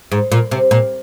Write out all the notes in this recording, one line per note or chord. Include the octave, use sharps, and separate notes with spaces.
G#2
A#2
C3
A#2